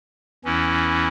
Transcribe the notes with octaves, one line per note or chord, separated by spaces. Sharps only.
E2 E3 C#4 E4